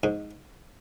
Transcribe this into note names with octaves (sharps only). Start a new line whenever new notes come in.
G#2